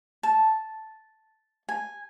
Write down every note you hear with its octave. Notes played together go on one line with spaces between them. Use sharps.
A5
G#5